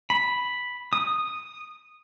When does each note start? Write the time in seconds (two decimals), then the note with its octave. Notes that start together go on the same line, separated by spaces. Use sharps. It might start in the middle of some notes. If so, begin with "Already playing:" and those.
0.10 B5
0.93 D#6